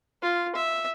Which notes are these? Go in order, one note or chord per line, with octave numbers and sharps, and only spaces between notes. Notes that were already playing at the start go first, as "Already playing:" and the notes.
F4
E5